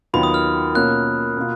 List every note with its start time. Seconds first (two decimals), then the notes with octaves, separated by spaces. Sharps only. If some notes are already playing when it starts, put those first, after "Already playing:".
0.13 D#2 D#3 F#3 B3 F4 B5
0.23 D#6
0.34 F6
0.75 B2 A#3 C#4 F4 F#6
1.36 B2 A#3 F4